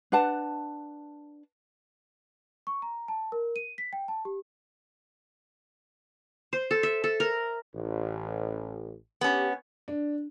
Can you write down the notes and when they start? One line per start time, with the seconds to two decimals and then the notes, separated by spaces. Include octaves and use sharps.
0.12 D4 B4 F#5 A5
2.67 C#6
2.82 A#5
3.08 A5
3.32 A#4
3.56 D#7
3.78 B6
3.93 G5
4.08 A5
4.25 G4
6.53 C5
6.71 A4
6.83 E5
7.04 A4
7.20 A#4
7.75 A1
9.21 B3 C#4 G4
9.88 D4